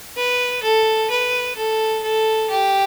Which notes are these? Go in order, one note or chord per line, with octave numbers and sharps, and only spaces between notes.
B4
A4
B4
A4
A4
G4